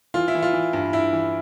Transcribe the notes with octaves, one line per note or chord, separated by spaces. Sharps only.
E3 F4
E4
E3
F4
E3
G2
G2 E4
E3